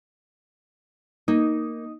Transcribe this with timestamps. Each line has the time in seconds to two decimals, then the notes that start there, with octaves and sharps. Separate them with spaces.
1.28 A#3 D#4